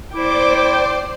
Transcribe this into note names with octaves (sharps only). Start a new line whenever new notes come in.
E4 C5 D5 G5 C6 D6